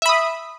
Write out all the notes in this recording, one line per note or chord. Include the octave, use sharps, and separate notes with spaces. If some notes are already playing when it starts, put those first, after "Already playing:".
E5 B5 D#6